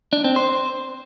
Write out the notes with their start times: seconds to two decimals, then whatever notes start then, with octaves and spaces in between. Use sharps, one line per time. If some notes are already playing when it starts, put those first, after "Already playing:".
0.13 D4
0.24 C4
0.36 C5